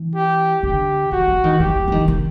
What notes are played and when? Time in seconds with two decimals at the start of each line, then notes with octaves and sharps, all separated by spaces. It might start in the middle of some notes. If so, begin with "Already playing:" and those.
Already playing: E3
0.15 G4
0.63 D3 G4
1.12 E3 F#4
1.28 F3
1.44 D#3
1.60 E3 G4
1.75 E3
1.88 E3
1.92 D#3
2.08 D#3